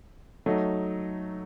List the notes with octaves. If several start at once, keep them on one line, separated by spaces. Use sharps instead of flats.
F#3 A3 D#4